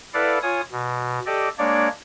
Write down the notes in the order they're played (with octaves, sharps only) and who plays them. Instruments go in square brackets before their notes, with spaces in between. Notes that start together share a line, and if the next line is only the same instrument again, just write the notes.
[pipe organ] E4 A4 B4 D5 F5 F#5
F4 C#5 G#5 D#6
B2
G4 A4 D5 D#5
G#3 A#3 D4 C#5 D5